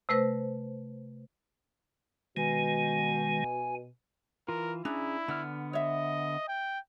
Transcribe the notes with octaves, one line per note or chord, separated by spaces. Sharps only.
C3 A3 B4 C5 A#6
B2 D#3 G#3 G#5
E3 F4 A#4
C#4 D4 E4 G#4 A#5
D3 B3 D4 F6
C#5 D#5 E5
G5